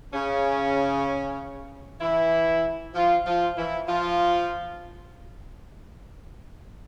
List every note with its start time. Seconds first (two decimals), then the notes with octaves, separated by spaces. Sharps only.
0.14 C#3 C#4
2.01 E3 E4
2.94 F3 F4
3.26 F3 F4
3.57 E3 E4
3.88 F3 F4